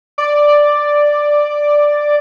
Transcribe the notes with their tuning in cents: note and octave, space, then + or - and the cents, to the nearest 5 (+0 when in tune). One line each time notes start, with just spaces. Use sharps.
D5 +5